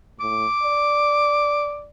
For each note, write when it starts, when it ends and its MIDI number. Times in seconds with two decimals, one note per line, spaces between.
0.20 0.46 45
0.20 1.81 86
0.63 1.90 74